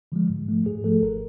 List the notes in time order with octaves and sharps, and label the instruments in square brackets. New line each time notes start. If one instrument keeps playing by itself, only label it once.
[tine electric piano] D3 F3 G#3
G#2
F3 A3
G#2 G#4
F3 A3 A4
G1 A#4